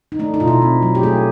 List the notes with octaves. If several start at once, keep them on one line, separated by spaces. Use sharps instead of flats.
D#4
A3 D4
D#4
B2 F4
E4
C4
F#3
G4
A3 G#4